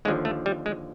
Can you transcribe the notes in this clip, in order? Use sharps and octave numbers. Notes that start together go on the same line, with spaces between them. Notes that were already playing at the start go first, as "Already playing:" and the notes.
D#2 D3 F3 G#3
A3
G3
G#3